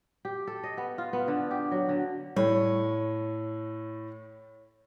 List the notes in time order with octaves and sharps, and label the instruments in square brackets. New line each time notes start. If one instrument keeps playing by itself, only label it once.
[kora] G4
A4
D#5
B3
F4
B3
D3
G4
F#3
D3
[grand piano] A2 [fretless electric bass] G3 [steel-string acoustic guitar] C#5